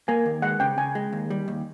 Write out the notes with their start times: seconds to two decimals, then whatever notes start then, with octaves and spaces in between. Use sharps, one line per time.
0.08 A#3 G#5
0.26 D#2
0.42 G#3 F#5
0.60 C#3 G5
0.78 C#3 G#5
0.95 G#3
1.13 D#2
1.30 G3
1.48 D#2